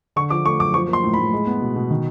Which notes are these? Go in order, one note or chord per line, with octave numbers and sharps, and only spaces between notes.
D3 C#6
F3 D6
A3 C#6
F#2 D6
F3 C#6
A#3
C6
A2
A2 B5
G#3
B3
B2
B2
D#3